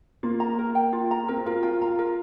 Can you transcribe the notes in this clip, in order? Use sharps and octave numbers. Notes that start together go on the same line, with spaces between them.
A#3 F4
A#5
A#4
G5
F4
A#5
C4 A#4
F4 A#4
F4 G5
F4 A#5
A#4